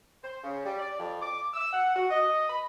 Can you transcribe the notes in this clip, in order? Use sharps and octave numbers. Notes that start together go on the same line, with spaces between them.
C5
C#3
G3
D5
F2
D6
E6
F#5
F#4
D#5
B5